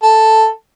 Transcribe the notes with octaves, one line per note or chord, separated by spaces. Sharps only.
A4